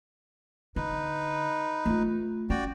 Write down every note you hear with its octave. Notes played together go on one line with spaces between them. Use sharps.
D3 D#4 B4
A3 F4
C#4 F#4 D5 G5